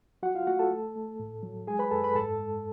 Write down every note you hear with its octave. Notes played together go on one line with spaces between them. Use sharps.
F#3 F#4 F#5
F4 F5
A3 F#4 F#5
A4 A5
A3
A3
A2
F#3
G#3 G#4 G#5
B4 B5
F#2 A4 A5
B4 B5
G#2 A4 A5
G#3